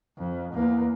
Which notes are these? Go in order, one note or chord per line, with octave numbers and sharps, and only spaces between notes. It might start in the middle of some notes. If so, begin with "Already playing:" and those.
F2
E2 A#3